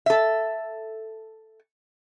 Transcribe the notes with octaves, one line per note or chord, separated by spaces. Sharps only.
A4 E5